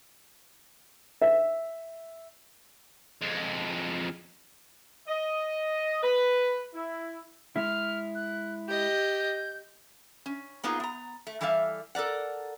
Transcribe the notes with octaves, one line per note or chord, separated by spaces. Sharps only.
E5
F2 G#3
D#5
B4
E4
G#3 E4 F6
F#6
G4 D#5 G6
C#4
A#3 B3 D#4 F4 G#4
B3 A#5
A3
E3 G3 A4 E5 F5
A4 A#4 D5 F#5